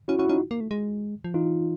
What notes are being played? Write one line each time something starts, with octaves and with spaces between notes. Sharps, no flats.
C#4 E4 F#4
C#4 E4 F#4
C#4 D#4 F4
A#3
A3
G#3
F3
E3 D#4 F4